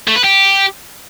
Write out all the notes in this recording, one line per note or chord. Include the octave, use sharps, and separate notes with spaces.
A3
B4
G4